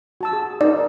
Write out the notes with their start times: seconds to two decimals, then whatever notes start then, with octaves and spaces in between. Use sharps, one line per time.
0.21 F#4 A5 E6
0.33 G#4
0.61 D#4 A#4 D5